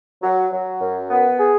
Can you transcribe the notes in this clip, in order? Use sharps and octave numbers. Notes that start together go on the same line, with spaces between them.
F#3
F#3
F#2
B3
G#4